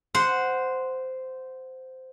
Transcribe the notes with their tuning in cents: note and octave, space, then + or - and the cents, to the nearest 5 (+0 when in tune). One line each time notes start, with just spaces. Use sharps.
C5 -10 F#5 -5